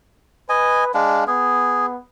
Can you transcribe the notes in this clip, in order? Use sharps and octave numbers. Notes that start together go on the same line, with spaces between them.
B4 D#5 G#5
G#3 D4 F5
B3 G#4